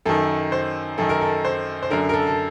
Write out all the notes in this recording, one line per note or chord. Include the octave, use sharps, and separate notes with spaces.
F#2 D#3 A4
C5
F#2 D#3 A4
A#4
A4
C5
C5
F#2 D3 A#4
A#4
A4
A4